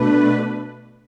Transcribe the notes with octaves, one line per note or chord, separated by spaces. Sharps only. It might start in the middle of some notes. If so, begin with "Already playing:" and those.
Already playing: B2 A3 D4 B4